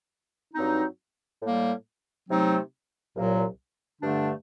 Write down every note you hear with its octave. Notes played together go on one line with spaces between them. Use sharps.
G2 F#3 C4 D#4
A2 G3 A#3
C3 F#3 A3 C4 D#4
C2 A#2 F#3 A#3
G2 D3 A3 D4